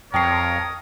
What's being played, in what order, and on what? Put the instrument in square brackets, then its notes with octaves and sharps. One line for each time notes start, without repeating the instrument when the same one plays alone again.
[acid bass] F2 [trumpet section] A#4 C#5 [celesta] G5 A5 C7 [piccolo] D#6